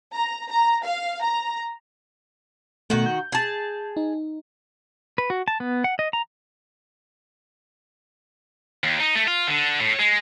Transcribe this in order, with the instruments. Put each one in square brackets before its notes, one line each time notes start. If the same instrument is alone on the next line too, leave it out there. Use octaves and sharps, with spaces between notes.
[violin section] A#5
A#5
F5
A#5
[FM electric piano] B2 A3 [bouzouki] D#3 F#4
[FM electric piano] G6
[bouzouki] G#4 A5
[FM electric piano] D#4
[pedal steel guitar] B4
F#4
A5
B3
F#5
D#5
A#5
[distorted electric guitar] D#2
D#4
A3
F4
D3
A2
G#3